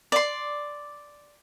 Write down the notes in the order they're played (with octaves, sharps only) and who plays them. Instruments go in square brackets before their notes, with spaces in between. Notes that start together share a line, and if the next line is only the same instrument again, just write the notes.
[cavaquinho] D5 C6